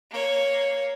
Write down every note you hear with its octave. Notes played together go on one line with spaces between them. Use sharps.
A#3 C#5